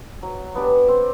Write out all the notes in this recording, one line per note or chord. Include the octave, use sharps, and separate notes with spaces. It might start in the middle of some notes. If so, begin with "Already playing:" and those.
F#3
B3 D4 G4
C4